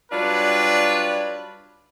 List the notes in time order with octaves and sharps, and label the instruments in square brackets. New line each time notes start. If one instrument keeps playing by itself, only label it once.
[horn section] F#3 G3 D4 F4 B4